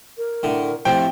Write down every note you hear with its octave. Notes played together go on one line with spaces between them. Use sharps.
A#4
A2 D3
F2 A2 F3 G4 G5